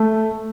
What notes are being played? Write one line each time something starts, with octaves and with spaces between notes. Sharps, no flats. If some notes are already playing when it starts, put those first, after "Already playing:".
Already playing: A3